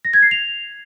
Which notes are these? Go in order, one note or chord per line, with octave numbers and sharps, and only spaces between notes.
A#6
G#6
C7
F7